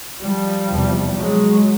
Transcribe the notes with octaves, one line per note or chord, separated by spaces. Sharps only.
F3 G3
E2 C3
F#3 G#3